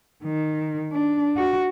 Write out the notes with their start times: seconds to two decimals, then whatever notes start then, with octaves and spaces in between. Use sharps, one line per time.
0.24 D#3
0.92 D4
1.37 F#4